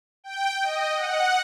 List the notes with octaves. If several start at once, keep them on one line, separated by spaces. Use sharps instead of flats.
G5
D#5
F#5